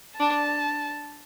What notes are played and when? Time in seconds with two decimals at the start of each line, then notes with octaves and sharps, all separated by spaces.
0.19 D4 A5